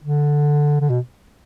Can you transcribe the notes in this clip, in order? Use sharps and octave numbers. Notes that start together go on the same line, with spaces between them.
D3
D3
B2